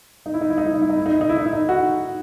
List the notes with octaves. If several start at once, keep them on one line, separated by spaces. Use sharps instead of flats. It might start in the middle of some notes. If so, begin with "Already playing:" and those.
D#4
E4
D#4
E4
D#4
E4
D#4
E4
D#4
E4
D#4
E4
D#4
E4
D#4
E4
D#4
F#4